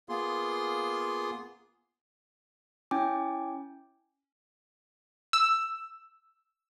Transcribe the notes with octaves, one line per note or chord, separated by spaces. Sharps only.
A#3 B3 F4 G#4 C6
C#4 E4 G5 G#5 D6
E6